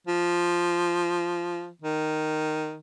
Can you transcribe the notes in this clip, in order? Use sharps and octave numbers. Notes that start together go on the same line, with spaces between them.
F3
D#3